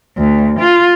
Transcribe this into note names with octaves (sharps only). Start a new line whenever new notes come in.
D2
F4